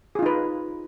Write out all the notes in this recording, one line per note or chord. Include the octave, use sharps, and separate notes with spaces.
D#4 F4 G#4 B4